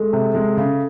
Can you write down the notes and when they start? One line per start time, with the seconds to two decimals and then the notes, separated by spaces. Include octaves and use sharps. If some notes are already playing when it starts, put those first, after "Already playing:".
Already playing: G#3 A3
0.13 C3
0.35 G#3
0.57 C#3